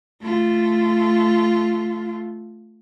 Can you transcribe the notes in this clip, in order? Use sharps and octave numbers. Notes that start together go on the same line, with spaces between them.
A3 F4